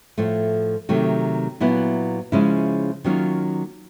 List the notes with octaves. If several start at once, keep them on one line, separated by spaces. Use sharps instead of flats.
A2 F3 A3
C3 D#3 F#3 A3
A#2 F#3 B3 E4
C#3 F3 G#3 C#4 E4
D#3 F#3 A#3 C#4 F4